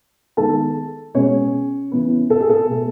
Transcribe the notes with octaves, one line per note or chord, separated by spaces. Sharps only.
D#3 G#3 B3 A4 A5
B2 G#3 B3 C#4 C#5
C#3 E3 B3
A4
G#4
A4
B2 A3